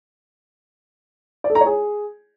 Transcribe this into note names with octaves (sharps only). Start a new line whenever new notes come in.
D5
A4
A#5
C#5
G#4